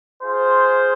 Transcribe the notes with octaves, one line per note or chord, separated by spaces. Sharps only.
F4 G#4 C5